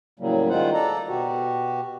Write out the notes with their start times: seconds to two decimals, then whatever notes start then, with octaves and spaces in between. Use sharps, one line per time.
0.20 A2 C#3 F#3 G3 A#3
0.49 D#3 G3 G#3 F4 C5 F#5
0.74 A4 D5 A#5
1.08 B2 F#4 G4